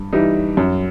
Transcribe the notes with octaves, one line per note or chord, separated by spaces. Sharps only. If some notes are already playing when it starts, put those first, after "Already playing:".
Already playing: G2
E3 G3 D#4
F#2